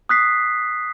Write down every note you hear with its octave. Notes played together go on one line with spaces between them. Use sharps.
D#6 F#6 B6 C7